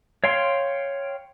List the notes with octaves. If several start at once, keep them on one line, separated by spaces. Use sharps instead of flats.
C#5 F5 G5 C6